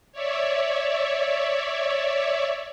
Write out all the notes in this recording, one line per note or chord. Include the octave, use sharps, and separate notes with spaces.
C#5 D5 E5